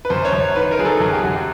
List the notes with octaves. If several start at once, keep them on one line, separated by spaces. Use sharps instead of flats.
B4
F#2 C5
C#5
F#2
C#5
D#3 B4
A#4
F#3 G#4
A4
F#2 G#4
G4
F#2 F#4
G4